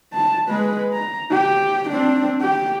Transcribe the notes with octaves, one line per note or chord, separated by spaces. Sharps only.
A5
G#3 B4
A#5
G4
C4 D4
G4